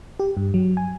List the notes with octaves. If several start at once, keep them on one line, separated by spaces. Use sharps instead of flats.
G4
G2
F#3
G#5